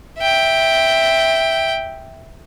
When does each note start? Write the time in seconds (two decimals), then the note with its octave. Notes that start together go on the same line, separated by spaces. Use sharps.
0.19 E5 G5